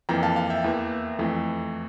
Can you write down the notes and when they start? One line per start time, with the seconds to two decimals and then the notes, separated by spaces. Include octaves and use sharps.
0.09 F2 E3 A#3 G5 A#5
0.23 F5 A5
0.36 F5
0.50 E5 G5
0.64 E2 E3 A#3
1.19 F2 E3 A3